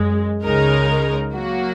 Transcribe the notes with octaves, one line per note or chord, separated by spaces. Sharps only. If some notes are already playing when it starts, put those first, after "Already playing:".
Already playing: F#2 G#3
C#2 C#3 G#3 D#4 A#4
F#3 A#3 F#4